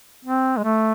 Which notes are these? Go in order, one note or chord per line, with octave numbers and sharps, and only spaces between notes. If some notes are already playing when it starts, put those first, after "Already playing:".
C4
G#3
A3